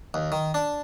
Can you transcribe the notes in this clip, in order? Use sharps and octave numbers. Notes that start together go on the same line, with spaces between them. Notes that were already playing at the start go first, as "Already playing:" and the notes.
D#2
D#3
D4